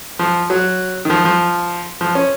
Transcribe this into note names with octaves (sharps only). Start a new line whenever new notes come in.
F3
F#3
D#3
F3
F3
F3
C#4